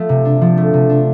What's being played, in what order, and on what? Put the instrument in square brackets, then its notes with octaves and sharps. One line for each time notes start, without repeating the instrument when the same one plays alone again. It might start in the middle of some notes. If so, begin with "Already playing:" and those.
Already playing: [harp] F3 A3
C3
D4
F3
A3
C3
D4